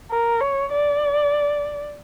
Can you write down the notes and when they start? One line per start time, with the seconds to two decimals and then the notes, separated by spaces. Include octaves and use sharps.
0.11 A#4
0.41 C#5
0.72 D5